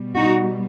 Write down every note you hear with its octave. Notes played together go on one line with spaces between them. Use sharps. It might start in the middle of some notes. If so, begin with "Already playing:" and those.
Already playing: B2 G3
D#4 F#4